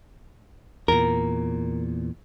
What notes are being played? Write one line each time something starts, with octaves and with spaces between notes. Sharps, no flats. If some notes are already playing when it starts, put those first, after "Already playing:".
E2 A#2 A#4